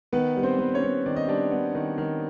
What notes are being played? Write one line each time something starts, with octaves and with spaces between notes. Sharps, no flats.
D#3 B3 B4
G3
C4 C5
B3
C#4 C#5
B3
D#3 D5
D#5
G3 D4 D5
B3
D#3
D#3